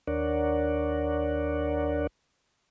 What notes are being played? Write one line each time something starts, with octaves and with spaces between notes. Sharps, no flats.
D#2 D4 A#4 C#5 D5 F#5